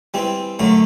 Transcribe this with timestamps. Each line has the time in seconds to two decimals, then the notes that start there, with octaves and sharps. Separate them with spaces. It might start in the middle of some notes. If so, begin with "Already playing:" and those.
0.14 E3 G3 C4
0.59 F#2 D3 F#3 A3